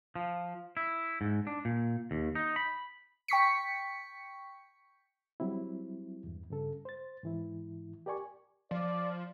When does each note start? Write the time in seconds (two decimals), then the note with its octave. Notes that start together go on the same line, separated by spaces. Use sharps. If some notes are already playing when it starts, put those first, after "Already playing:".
0.16 F3
0.77 E4
1.21 G#2
1.47 D4
1.65 A#2
2.11 D#2
2.35 D#4
2.56 B5
3.28 G5 C#6 B6 C#7
5.40 F#3 G3 C4 E4
6.24 E2 G2
6.50 G2 C#3 A4
6.85 C5 A6
7.23 G#2 E3 E4
8.06 G4 A#4 D5 G#5 C#6
8.71 F3 D5